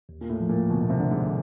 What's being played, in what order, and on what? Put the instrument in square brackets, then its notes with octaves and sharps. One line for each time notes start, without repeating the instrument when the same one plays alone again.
[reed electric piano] D#2
[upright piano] A#2
A2
[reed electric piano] F3
[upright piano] A#2
[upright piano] B2 [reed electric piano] D3
[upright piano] B2
C3
[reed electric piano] D3
[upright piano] G#2